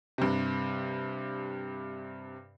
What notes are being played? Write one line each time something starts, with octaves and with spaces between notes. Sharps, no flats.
G2 C3